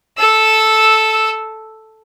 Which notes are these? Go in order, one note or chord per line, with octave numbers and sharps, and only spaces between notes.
A4 E6